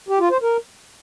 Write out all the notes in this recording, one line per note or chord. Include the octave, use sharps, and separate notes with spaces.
G4
F4
C5
A#4